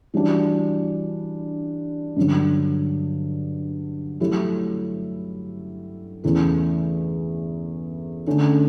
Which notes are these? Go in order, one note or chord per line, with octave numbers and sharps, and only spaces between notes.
E3 G3 D4 F#4
G2 D3 F#3
F#3 A3 E4 G4
E2 C#3 E3 A3
D3 A3 C#4